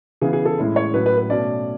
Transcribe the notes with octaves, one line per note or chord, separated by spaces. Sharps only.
C#3 E3 B3 G#4
G#4
A4
A2 G#3 C#4 E4
C#5
A2 F#3 C#4 E4 B4
B4
B4
B2 A3 C#4 D5